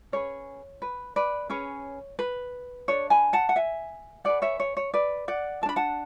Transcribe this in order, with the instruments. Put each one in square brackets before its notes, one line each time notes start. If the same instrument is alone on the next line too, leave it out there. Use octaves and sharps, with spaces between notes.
[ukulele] C#4 G#4 B4 C#5
B4
B4 D5
C#4 G#4 B4 C#5
B4
D4 A4 C#5
G#5 B5
F#5 A5
F#5
E5 G#5
E4 G#4 B4 D5 F#5
C#5 E5
C#5
C#5
B4 D5
D5 F#5
A4 A5
D4 B5
F#5 A5